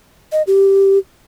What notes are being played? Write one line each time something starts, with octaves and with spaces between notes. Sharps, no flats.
D#5
G4